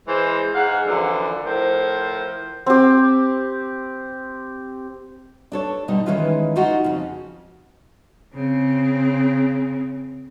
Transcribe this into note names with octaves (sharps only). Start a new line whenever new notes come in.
E3 G#3 C5
G#2 F5 F#5
F#2 D3 E3 F3
A2 F3 A#4 C5
C4 G4
D4 A4 C#5
B2 D3 G3 D#4
D#3 E3 G#3 C#4 F4 B4
D#4 F4 F#4 D#5 F#5
F2 C#3
C#3 C4